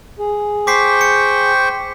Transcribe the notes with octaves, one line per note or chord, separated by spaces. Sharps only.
G#4
C5 G5 C#6 D6 B6 C7
C#7